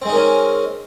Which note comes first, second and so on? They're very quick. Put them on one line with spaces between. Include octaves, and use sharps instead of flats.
C4 G#3 D#4 A#4 C#4